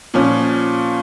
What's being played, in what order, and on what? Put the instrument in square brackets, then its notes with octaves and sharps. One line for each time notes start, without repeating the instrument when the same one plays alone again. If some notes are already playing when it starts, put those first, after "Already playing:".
[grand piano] A#2 F3 C#4